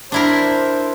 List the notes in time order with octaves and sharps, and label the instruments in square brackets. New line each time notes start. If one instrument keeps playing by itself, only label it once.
[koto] D4 E4 A#4 [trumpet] C5